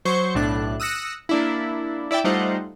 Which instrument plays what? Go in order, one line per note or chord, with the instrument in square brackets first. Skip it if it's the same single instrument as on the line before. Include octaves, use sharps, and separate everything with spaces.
[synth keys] F#3 C5 C#6
B1 A2 D4 F#6
D#6 E6 F#6 A#6 C#7
A#3 D4 E4
E4 D5 E5 G5
G3 A3 D#4 F4 C5 F#5